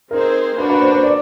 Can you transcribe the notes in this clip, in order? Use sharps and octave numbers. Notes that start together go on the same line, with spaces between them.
C4 D#4 G#4 A#4 C5
A#3 D4 F#4 B4
B4
C5
C5
D5